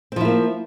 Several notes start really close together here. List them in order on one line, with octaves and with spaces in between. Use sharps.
C4 F3 E4 A#3